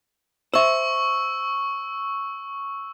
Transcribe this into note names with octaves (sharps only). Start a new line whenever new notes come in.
C5 E5 C#6 E6